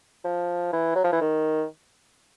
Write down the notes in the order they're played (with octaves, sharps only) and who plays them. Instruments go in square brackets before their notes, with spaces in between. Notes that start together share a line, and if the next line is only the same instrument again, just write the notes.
[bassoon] F3
E3
F#3
F3
E3
D#3